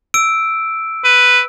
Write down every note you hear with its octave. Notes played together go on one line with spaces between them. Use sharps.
E6 D7
B4